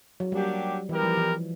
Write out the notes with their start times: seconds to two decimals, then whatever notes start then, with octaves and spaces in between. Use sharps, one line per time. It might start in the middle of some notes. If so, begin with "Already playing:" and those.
0.20 F#3
0.32 F#3 G3 A#3 D4 G4
0.89 E3 G3 B3 E4 G4 A#4
1.03 F3
1.17 E3